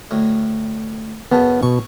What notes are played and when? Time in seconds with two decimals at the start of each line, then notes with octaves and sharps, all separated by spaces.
0.11 D2 A2
1.31 F#2 C#3 B3 A5
1.63 B2 C#6